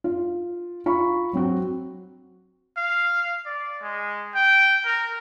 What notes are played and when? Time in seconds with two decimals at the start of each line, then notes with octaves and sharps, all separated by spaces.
0.04 F4
0.86 F4 A#5 B5 C#6
1.33 F#3 C4 F#4
2.77 F5
3.46 D5
3.82 G#3
4.35 G5
4.85 A#4